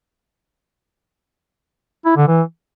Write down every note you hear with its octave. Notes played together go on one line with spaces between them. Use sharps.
E4
D3
E3